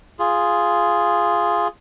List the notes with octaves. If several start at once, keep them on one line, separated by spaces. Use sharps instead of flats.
F4 G#4